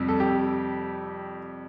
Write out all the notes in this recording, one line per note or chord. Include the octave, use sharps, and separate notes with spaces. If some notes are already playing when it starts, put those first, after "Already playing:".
Already playing: F2 C3 G3
A4
G4